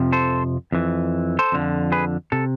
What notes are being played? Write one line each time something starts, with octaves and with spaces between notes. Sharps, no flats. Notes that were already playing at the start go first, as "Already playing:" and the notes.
Already playing: F2 C3 F3
A4 C5
F2 E3
A4 C5
F2 D3 F3
G#4 B4
C3 A4